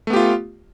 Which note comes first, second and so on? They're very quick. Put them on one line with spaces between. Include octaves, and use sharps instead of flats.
A3 B3 G4 F4